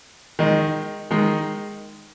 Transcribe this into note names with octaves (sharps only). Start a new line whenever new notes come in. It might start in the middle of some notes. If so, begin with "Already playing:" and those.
D#3 G#3 D#4
D#3 G#3 D#4